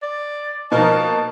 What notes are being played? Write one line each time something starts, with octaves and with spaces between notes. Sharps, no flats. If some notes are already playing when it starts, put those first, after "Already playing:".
D5
B2 F3 A#3 D#4 A#4 A5